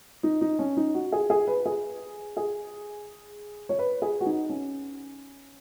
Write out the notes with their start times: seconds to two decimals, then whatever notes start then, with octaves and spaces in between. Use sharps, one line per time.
0.23 D#4
0.41 D#4
0.59 C#4
0.77 D#4
0.94 F#4
1.12 G#4
1.30 G#4
1.47 B4
1.66 G#4
2.37 G#4
3.69 C#5
3.79 B4
4.02 G#4
4.21 F#4
4.26 D#4
4.49 C#4